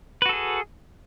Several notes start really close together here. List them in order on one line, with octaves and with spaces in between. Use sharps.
B4 F#4 A4 G#4